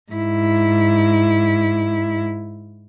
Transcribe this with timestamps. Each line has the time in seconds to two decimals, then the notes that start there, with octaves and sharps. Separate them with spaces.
0.12 G#2 E4